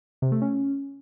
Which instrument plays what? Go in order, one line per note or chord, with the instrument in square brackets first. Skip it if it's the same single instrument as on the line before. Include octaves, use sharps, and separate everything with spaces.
[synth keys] C3
A3
C#4